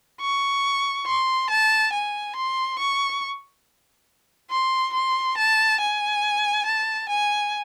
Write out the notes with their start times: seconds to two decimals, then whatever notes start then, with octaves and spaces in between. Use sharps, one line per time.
0.21 C#6
1.06 C6
1.50 A5
1.93 G#5
2.36 C6
2.79 C#6
4.50 C6
4.94 C6
5.37 A5
5.81 G#5
6.66 A5
7.09 G#5